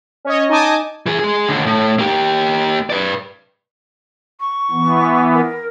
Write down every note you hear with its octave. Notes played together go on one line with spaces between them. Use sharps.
C#4 C#5 D#5
D#4 D#5 G#5 A5 D6 D#6
E3 G#4
G#3 G#4
D#2 D3
A2
A#3 G4
B4 D5
C#6
E3 B3
A#4